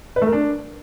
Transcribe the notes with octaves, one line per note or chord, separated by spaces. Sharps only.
B4
A3
A#4
D4